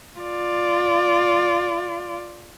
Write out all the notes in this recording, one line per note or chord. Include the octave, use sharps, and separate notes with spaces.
F4 D5